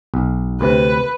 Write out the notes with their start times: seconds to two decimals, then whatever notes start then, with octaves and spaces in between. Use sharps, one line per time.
0.14 B1
0.61 D2 C3 B4